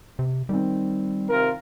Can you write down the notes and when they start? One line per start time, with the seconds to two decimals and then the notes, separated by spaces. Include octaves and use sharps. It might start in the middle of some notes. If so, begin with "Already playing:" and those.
0.19 C3
0.49 D#3 G3 C4
1.29 C3 F4 A#4